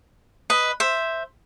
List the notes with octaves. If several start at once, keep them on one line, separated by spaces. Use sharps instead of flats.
B4 D#5
C5 E5